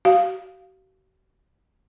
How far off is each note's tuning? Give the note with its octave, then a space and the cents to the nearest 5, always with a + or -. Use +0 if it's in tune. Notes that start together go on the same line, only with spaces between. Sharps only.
F#4 +40 F5 +0